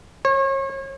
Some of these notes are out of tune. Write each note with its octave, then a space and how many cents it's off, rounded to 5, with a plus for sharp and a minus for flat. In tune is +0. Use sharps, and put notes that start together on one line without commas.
C#5 -35